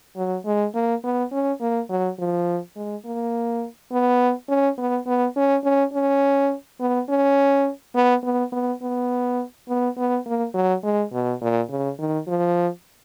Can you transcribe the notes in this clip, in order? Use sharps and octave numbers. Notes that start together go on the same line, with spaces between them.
F#3
G#3
A#3
B3
C#4
A#3
F#3
F3
G#3
A#3
B3
C#4
B3
B3
C#4
C#4
C#4
B3
C#4
B3
B3
B3
B3
B3
B3
A#3
F#3
G#3
B2
A#2
C#3
D#3
F3